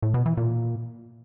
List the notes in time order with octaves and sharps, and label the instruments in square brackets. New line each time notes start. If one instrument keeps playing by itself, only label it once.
[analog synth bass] A2
B2
E3
A#2